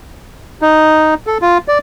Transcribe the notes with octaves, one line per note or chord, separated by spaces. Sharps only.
D#4
A4
F4
D5